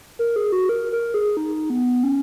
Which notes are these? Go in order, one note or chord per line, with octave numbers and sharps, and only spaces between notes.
A#4
G#4
F#4
A#4
A#4
G#4
D#4
B3
C#4